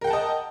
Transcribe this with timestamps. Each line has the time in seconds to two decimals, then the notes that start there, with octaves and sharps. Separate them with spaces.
0.01 A#4
0.04 G5
0.07 F#5
0.10 A5
0.13 D#5